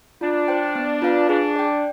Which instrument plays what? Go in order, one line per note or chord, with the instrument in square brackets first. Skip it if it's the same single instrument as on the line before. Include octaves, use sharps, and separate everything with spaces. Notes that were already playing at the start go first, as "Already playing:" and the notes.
[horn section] D4 [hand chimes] F4
[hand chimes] C5 G5
B3
F4 B4 F5
[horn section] D4 [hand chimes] G#4
[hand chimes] D5 G5